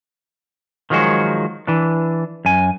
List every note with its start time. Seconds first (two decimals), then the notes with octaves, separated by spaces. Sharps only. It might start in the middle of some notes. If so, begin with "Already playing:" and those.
0.90 D#3 F3 F#3 G#3 F#4
1.67 E3 D4
2.45 F#2 G#5